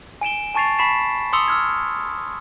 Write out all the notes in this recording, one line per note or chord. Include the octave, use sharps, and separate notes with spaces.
G#5 D7 E7 G7
G#5 A5 C#6 A6 C7 F7
A5 B5 C#6 B6 C7 E7
C6 D#6 E6 C#7 F7 G7
E6 F6 G#6